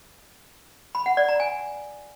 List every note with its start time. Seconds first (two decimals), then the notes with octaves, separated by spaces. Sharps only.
0.95 B5
1.06 F#5
1.17 D5
1.29 A#5
1.40 G#5